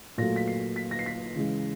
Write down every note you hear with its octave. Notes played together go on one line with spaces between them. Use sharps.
A#2 F#3 A3 A#6
B6
C7
B6
A#6
C7
B6
C#3 E3 G#3